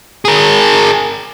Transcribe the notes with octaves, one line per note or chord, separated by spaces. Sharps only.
G#4 A#4